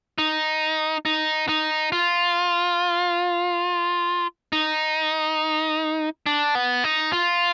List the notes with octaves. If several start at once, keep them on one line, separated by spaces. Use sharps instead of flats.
D#4
D#4
D#4
F4
D#4
D4
B3
D#4
F4